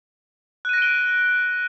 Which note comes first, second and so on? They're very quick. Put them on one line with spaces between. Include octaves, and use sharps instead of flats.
F#6 D#7 A#6 D7 G7